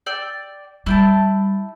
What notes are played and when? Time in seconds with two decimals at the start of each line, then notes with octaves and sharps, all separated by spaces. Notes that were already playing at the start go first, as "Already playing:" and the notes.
0.06 D5 G5 E6
0.86 G3 E4 G5 A5